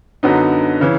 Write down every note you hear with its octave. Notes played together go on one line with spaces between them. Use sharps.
F#2 D3 F#3 B3 D#4
C#3 E3